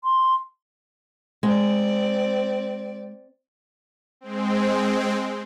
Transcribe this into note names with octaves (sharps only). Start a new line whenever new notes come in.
C6
G#3 C4 D5
G#3 C4